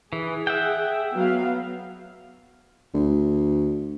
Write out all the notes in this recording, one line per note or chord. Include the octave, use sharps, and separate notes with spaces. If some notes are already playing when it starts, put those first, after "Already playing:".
E3 G#4
E5 F#5 G5
F#3 B3 F5
D2